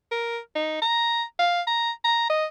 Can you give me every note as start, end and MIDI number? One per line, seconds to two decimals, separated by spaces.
0.11 0.39 70
0.55 0.79 63
0.82 1.23 82
1.39 1.62 77
1.67 1.91 82
2.04 2.27 82
2.30 2.45 75